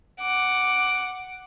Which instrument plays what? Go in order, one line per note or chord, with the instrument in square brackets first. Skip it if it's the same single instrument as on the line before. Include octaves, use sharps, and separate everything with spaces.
[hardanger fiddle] F#5 D6